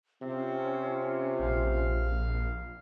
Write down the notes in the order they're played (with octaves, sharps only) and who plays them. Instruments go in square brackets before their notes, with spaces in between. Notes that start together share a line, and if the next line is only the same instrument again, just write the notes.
[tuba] C3 [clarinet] C4 [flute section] C#4 F4
[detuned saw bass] A#1 [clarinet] F5